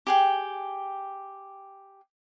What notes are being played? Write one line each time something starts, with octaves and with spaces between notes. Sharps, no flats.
G4 G#4 G5